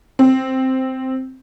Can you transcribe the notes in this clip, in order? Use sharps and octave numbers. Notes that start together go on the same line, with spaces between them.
C4